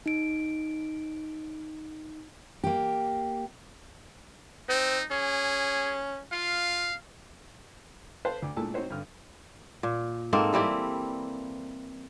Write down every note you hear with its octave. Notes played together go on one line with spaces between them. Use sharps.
D#4 D7
A#3 G4
C4 D#4
C#4 G#4
F4 F5
A4 B4 C5 F5 A5
D2 D6
A#2 G#3 A3 E4 A5 E6
C4 D#4 F#4 C5 C#5
G2 D3 F6
A#2
G#2 A#3 C4 A4
E3 G3 C4 E4